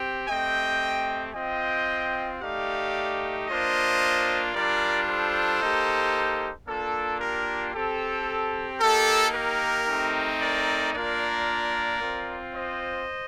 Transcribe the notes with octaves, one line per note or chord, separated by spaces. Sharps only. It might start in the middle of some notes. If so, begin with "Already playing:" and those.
Already playing: C4 G4
A3 C4 G4 D#5 G5
C4 F4 D#5 G5
A3 D#4 G4 D5 F5
A#3 D4 F4 C5 D#5
G3 D4 F4 A#4 D5
A4 C5
A#3 D#4 G4
A#3 D4 F4 A4
G4 A#4
C4 G4 A4
A#3 D#4 G4 A4
G4 A#4
A3 C4 D#4
A#4 D5
A#3 D4 F4 A#4 D5
C4 F4
C5 D#5